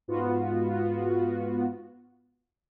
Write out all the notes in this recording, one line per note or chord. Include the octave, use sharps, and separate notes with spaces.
G#2 B3 F4 F#4